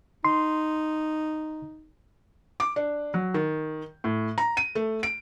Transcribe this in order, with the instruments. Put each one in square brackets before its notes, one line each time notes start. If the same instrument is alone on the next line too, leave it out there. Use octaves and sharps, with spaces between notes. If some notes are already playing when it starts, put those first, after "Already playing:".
[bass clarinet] D#4 [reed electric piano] C6
[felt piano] D6
D4
F#3
D#3
A2
A#5
D#7
A3
D7